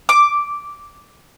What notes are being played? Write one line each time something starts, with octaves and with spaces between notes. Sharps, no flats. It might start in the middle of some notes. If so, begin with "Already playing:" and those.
D6